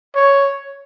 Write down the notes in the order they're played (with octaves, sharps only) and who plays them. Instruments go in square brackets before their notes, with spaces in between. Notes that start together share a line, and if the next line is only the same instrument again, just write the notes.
[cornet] C#5